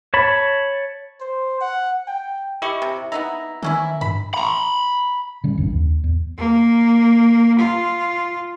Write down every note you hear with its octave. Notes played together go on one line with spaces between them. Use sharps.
C#5 A5 B5
C5
F#5
G5
E4 G4 D#5 C#6
C3
B3 D#4 E4 A#5
D#3 E3 C#4 E4
G2 B5
A#5 B5
C#3 G3 C#4
G#1 F2 D#3 D4
D#2
E2
A#3
F4